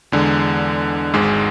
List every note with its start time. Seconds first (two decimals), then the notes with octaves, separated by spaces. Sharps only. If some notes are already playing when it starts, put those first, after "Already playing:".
0.12 E2 D3 G#3
1.13 G#1 G#2 G#3